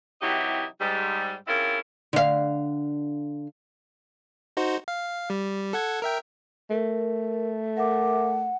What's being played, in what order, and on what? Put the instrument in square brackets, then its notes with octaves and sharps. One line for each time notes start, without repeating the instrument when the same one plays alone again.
[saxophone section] C3 E3 F#3 D#4 E4 G4
G#2 G3
C4 C#4 E4 F4 G#4 A#4
[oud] D3 F5
[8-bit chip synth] D#4 F#4 C5
F5
G3
A4 F#5 G#6
A#4 E5 G5
[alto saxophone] A3 [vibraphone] A#4
[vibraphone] A#4 E5 D6 [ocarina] F#5